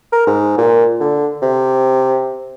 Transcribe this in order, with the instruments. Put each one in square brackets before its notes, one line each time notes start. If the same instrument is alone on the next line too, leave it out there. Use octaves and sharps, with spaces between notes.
[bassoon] A#4
G#2
A#2
D3
C3